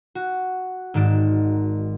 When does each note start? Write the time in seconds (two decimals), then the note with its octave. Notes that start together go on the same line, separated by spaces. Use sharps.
0.15 F#4
0.94 G#1 G#2 D#3 D5 E7